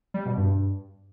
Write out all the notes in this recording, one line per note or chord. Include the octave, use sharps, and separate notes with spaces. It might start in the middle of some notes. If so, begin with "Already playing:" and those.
G3
B2
G2